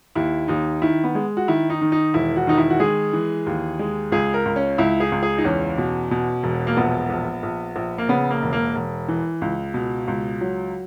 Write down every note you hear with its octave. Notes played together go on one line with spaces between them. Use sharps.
D#2 E4
D#2 D#4
D#3 E4
B3
G#3
F#4
D#3 E4
D#4
D#3
D#4
E1 E4
F#4
D#3 D#4
E4
F#4
G#3 G#4
E3
D#2
G#3
C#2 G#4
A#4
C#2
C#4
C#2 E4
G#4
C#2
G#4
D#4
E2 C#4
B2
B2
E1
A#3
A#1 B3
A#1
A#1
A#1
A#3
C#3 B3
A#3
E1
A#3
E1
E3
C#2
B2
C#2
F#3